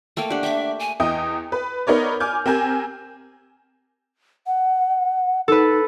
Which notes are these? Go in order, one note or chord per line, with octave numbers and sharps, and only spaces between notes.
A3 A#3 F5 G5
D4 G4 F#5
E5 G5 D6
G#5
E2 D#5 G5 D#6
B4
B3 D#4 A#4 C#5 D5
G#5 D6 F6 G6
C4 G4 A#4 G#5 G6
F#5
D#4 A4 B4